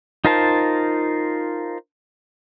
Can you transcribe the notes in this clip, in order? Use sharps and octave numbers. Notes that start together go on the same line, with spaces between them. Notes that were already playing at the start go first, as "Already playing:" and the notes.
D#4 F4 A#4 C5 A5